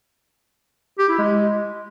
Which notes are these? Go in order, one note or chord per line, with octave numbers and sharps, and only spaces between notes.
G4
E4
G#3